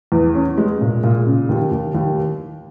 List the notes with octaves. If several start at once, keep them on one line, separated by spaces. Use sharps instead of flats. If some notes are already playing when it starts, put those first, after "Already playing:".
E2
C#4
G#3
A#2
A#2
C#3
D#2
D#2
D#2